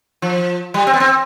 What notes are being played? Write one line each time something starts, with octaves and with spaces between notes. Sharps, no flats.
F3
G3
C4
B3
C4